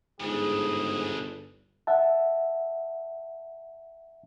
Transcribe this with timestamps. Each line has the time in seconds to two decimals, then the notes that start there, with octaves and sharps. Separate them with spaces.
0.20 G1 G#2 C#3 D4 G#4
1.87 E5 F#5 A5